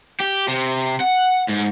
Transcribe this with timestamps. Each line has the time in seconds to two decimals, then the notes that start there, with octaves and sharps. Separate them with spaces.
0.20 G4
0.48 C3
1.00 F#5
1.49 G#2